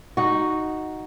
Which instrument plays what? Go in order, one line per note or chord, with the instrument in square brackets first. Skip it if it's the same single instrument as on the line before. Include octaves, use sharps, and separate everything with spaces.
[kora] D#4 F#4